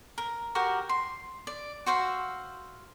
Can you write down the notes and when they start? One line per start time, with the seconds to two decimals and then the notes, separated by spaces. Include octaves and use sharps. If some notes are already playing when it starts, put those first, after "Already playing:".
0.18 A#4
0.55 F#4 G4 A#4
0.89 C6
1.47 D5
1.86 F#4 C5 E5 F5